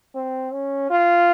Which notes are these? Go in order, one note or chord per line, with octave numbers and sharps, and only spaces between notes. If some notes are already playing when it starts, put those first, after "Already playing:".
C4
C#4
F4